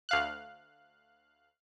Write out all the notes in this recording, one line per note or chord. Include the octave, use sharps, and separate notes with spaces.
D2 F5 F#6